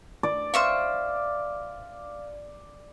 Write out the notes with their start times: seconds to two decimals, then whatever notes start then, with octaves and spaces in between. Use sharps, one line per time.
0.23 D5
0.54 C5 E5 F5 C#6 F6